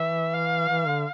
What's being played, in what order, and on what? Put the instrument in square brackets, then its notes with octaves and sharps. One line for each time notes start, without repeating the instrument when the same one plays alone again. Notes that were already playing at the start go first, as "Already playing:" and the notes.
Already playing: [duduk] E3 [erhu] E5
[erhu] F5
[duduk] E3
D3